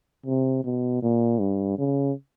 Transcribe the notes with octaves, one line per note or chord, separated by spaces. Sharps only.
C3
B2
A#2
G2
C#3